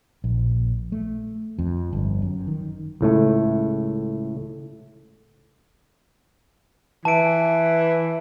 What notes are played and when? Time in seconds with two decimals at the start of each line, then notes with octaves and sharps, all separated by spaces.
0.24 A#1
0.92 A3
1.59 F2
1.93 G1
2.22 F#2
2.48 D#3
3.01 C#2 A2 A3
7.05 E3 A5 D7